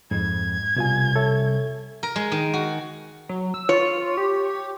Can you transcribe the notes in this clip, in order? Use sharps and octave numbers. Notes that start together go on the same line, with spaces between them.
F2 G#2 G#6
C2 B2 F4 G#5
A4 C#5 E5
A#4
G#3
D#3
F#4
F#3
E6
F4 C#5
G4